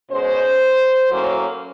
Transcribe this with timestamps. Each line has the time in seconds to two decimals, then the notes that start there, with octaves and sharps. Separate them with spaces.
0.10 B2 G#3 C#4 C5
1.10 A2 F#3 A#3 C#4